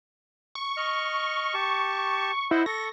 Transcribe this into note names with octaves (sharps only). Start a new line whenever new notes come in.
C#6
D#5 F6
G4 A5
E4 C5 D#5 F#5
A4 C#6 A#6